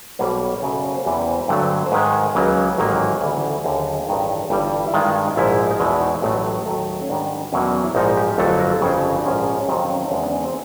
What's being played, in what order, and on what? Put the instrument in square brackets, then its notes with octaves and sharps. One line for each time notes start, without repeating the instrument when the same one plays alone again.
[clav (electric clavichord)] B1 B2 G3 A#3 C5
C#5
F#2 C#3 F#3 A3 D5
D5
C#5
C5
E2 C3 E3 G3 B4
C5
G2 D3 F#3 A3
C5
G#2 D#3 G#3 B4
A#4
C#2 C#3 F#3 A#3
A1 G#2 D#3 F#3 A#3
D2 C#3 E3 G3 G#4
A4
D#2 D3 F#3 G#4
A1 G2 D#3
G1 G2 E3 G3
E4
G2 D#3 G#3 F4
D#4
A#1 G#2 F3 E4
D#4
E2 B2 G#3 E4
D#4
A1 A2 F#3 A3
D#2 D#3 F#3 A3
C#4
G#2 D#3 G3 D4
E2 B2 F#3 A#3 C#4
E4
A#1 G#2 F3 D#4
G4
G1 F2 D3 F#3 A3 A4
A#4
A4
G1 F2 C#3 G#4
G4
D4
A#1 G#2 F3 C#4
C#4
F2 C3 D#3 F#3 C4
C#4
D#4
E2 C#3 F3 G#3 D4
D4
D#4
C4